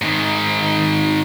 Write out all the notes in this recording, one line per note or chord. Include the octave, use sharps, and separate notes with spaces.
G#2 D#3